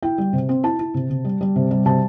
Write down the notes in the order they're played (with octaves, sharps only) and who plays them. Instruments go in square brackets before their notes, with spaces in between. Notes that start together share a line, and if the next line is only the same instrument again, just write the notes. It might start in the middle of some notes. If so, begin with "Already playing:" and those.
[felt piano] E4 G5
G3
C3
C4
E4 A5
E4
C3
C3
G3
G3
C3
G3
C3 A5